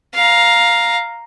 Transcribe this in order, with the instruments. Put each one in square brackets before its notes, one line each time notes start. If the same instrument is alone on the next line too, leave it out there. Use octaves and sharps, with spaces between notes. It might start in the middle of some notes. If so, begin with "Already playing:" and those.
[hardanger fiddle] F5 A#5